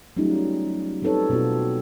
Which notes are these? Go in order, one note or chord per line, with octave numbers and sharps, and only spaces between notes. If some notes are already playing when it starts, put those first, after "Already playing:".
F#3 G3 A3 C#4 D#4 F4
G3 C4 D#4 A4 B4 C#5
B2 B3 C4 F4 F#4